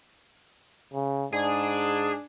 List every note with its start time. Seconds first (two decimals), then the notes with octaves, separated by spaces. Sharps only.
0.94 C#3
1.32 G#2 D4 G#4